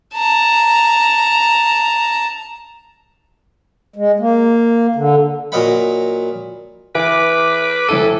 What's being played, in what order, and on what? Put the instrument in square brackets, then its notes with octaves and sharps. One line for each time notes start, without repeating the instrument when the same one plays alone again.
[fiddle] A5 A#5
[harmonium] G#3
A#3
D3
[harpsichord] A#2 F#3 A#4 D#5 F#5 B5
[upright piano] E3 [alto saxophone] B4 [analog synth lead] D6
[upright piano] F1 E4 D#7 [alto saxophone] A4